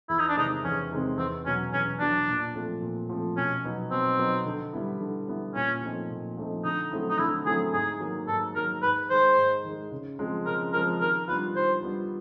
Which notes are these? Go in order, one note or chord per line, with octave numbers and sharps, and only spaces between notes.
E2 E4
D#4
D4
C3 D#3 G#3 C4 D#4
E2 C#4
C3 D#3 G#3 C4
E2 C4
B2 F#3 C#4
E2 C#4
B2 F#3 D4
A#2
F3 A3 C4
A#2
F3 A3 C4
B2 C#4
F#3 B3 D#4
B2 C4
F#3 B3 D#4
D3
G3 B3 E4
D3
G3 B3 E4
A#2 C#4
F3 A3 C4 D#4
A#2
F3 A3 C4 D#4
D3 D#4
F#3 A3 C4 E4
D#4
D3 E4
F#3 A3 C4 E4 G#4
G#2 G#4
D#3 F#3 A#3
G#2 A4
D#3 F#3 A#3 A#4
G#2 B4
D#3 G#3 C5
G#2
D#3 G#3
C#3
F3 G#3 C4
C#3 A#4
F3 G#3 C4 A#4
D#3 A#4
G3 B3 D4 F4 B4
D#3 C5
G3 B3 D4 F4